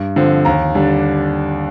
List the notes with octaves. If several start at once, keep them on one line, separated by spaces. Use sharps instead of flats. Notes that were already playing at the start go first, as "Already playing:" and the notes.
Already playing: G2
D3 F3 C4
D#2 A#5
D3 G3 D4